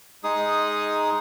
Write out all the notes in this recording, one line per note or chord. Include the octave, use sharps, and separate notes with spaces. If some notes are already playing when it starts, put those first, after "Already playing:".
G#3 D#4 G#4 D#6